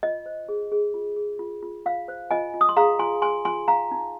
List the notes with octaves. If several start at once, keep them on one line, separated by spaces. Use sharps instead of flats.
F4 D#5
C5
G#4
G#4
F4
G#4
F4
F4
F4 F5
C5
F4 D#5 G#5
F4
D#6
C6
G#4 F5 A#5
F4 G#5 C6
G#4 G#5 C6
F4 G#5 C6
D#4 F5 A#5
D#4